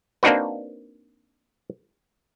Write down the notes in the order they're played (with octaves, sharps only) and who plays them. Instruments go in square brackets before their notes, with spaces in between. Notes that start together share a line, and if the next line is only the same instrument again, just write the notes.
[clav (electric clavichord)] A#3 C4 D4 D#4 F#4 B4